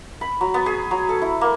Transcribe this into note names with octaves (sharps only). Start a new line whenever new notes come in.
B5
F#3
B3
G#4
F#3
A4
E4
A#3